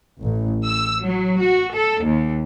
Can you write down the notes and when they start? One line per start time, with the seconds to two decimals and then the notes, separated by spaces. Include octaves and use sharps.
0.20 A1
0.64 E6
1.03 F#3
1.40 F#4
1.74 A4
2.04 D#2